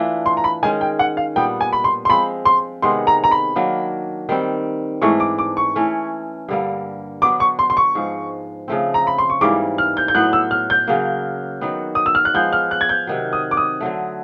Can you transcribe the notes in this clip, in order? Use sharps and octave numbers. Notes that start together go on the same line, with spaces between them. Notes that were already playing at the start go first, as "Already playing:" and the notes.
Already playing: E3 A3 D4 F4
C6
A#5
B5
D#3 G#3 C#4 G#5
G5
F#5
F5
A#2 G3 B3 D4 G5
G#5
B5
C6
C6
F3 G#3 C4 B5
C6
C3 D#3 G#3 B3 C6
A#5
A#5
B5
D#3 F#3 A#3 D4
D#3 G3 C4
G#2 E3 A3 D4 C#6
D6
D6
C#6
E3 A3 C#4
G2 D3 G3 A#3
F#3 B3 D4 D6
C#6
C6
C6
C#6
G#2 F3 G#3
C#3 F3 A3 C4
A#5
B5
C6
C#6
G#2 E3 G3 A#3 D6
F6
G6
G6
A2 F#3 B3 F#6
E6
F6
G6
C#3 F#3 A#3
D#3 F#3 B3
D#6
E6
F6
F#6
F3 G#3 B3 G6
F6
F#6
G#6
G6
C3 D#3 F#3
D#6
D6
D#6
D3 F#3 A3